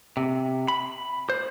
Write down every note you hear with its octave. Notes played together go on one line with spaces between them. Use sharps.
C3
B5
C5